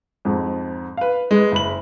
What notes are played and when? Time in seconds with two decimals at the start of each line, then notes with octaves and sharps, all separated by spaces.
0.25 F2 G#2
0.97 B4 F5
1.31 G#3 B4
1.52 F#1 B5 F#7